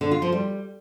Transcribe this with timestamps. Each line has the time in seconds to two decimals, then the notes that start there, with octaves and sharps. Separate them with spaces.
0.01 D3
0.11 F4
0.22 F3
0.32 G3